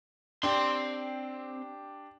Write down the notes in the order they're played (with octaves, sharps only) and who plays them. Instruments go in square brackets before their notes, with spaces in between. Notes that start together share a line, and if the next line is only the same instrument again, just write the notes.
[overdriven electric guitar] C4 C6 [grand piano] D4 G4